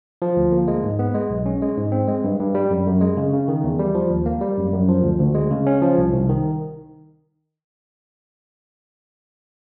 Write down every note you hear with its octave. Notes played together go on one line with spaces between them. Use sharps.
F3
D2
A#3
G#3
G#2
B3
G#3
B1
C#4
G#3
G#2
C4
G#3
G2
G2
G3
F#2
F#2
G#3
C#3
C#3
D#3
E2
G3
F3
D#2
A#3
G3
F#2
F#2
F3
D2
D2
G#3
C#3
C#4
F3
C2
C2
D#3